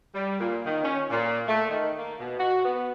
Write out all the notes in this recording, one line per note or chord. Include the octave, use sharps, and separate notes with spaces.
G3
A#2
D#3
C#4
A#2
A3
D#3
A#3
B2
F#4
B3